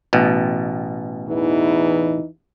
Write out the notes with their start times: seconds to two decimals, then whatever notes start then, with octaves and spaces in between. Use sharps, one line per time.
0.13 A1 B2
1.27 E2 E3 D#4